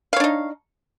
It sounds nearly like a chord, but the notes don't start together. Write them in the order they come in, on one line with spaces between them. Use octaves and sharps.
F5 C#5 D4 D#4